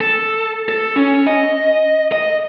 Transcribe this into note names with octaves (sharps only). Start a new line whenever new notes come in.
A4
A4
C#4
D#5
D#5